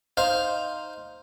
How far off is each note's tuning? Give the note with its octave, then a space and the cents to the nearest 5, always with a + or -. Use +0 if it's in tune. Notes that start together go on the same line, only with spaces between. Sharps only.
D#4 +0 C5 +0 F5 +0